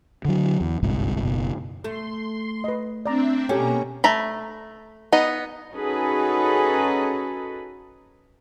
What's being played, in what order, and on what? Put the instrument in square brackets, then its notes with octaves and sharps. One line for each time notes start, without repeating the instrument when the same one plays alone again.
[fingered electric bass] D3 F#3
E2
G1 C2 G#2 C3
F#1 B2
[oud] A3 [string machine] C6
[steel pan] B4 D#5
[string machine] C4 D4 E5 [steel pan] D5 A#5
[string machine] B2 A#3 A#5 [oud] C#4 [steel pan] G4 A4 G5
[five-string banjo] A3 A#5 B5
B3 D#4 D#5
[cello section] C#4 D#4 F#4 G#4 A4 B4